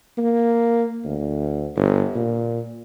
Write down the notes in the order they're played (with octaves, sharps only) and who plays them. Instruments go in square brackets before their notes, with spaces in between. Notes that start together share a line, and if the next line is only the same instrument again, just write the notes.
[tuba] A#3
D2
G1
A#2